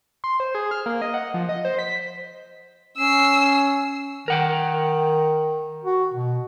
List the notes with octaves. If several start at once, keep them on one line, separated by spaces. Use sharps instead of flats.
C6
C5
G#4
F6
A#3
D#5
F#5
F3
D#5
C5
B6
C#4 E6 C7
D#3 A#4 F#5 G5
F#4
B2